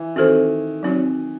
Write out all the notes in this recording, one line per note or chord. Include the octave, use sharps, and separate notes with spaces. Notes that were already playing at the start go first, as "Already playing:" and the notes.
Already playing: E3
D#3 C4 F#4 A4 C5
F#3 C4 D#4 F#4 C#5